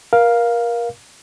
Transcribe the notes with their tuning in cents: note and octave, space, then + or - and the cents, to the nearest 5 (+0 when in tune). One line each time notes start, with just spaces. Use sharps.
A#4 +25 F5 +0